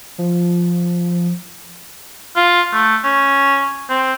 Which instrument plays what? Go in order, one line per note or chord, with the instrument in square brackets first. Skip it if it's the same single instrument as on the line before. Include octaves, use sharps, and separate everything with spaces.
[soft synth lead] F3
[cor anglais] F4
A3
C#4
C4